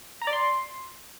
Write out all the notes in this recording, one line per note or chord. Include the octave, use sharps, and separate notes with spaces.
A#5
D5
C6